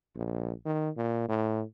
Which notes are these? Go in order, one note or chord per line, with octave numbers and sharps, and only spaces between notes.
A#1
D#3
A#2
A2